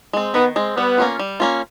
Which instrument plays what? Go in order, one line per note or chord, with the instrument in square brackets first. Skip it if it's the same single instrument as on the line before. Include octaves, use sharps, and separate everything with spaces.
[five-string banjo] G#3 C4
[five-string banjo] D#3 [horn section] B3
[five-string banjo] G#3 C4
[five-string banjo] G3 [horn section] B3
[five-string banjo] A#3 C#4 F4
G3
A#3 C#4 F4